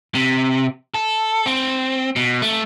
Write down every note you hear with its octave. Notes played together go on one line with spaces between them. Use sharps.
C3
A4
C4
B2
A3